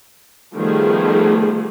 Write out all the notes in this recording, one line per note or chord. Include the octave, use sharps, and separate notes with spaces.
D#3 F3 G3 A3 B3 G#4